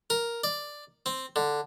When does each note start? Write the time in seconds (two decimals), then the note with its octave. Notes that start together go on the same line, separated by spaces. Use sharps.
0.10 A#4
0.44 D5
1.06 C4
1.36 D3